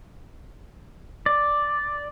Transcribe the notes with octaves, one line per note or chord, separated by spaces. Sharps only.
D5